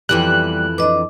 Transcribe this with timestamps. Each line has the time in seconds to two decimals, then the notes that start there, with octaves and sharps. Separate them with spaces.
0.09 F2 E3 G3 B3 E5 F#6
0.78 B3 D4 D#5 D6